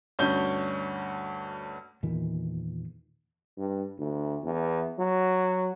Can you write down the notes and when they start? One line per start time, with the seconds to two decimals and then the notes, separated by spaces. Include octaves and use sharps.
0.19 D2 G2 C#4 F#4 G6 G7
2.03 E2 A#2 D#3 E3
3.58 G2
3.98 D2
4.43 E2
4.99 F#3